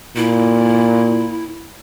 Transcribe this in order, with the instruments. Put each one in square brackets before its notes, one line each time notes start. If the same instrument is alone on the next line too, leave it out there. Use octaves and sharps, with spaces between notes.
[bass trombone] A#2 [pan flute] E4